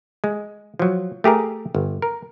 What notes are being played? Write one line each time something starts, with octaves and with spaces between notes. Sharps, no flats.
G#3
F3 F#3
A3 G4 G#4 A#4
G1
A#4